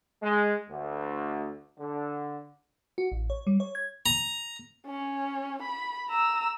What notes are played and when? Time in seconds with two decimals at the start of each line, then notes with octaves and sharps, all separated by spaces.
0.23 G#3
0.69 D2
1.78 D3
2.98 F#4
3.12 A1
3.30 C#5
3.47 G3
3.60 C#5
3.75 G#6
4.06 A#5
4.87 C#4
5.63 B5
6.10 A#5 E6